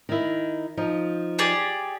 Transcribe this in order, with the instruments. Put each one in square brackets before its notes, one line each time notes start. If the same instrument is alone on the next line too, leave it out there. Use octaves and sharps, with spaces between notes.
[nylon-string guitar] D#3 E4
F3 D#4
[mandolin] G4 G#4 D5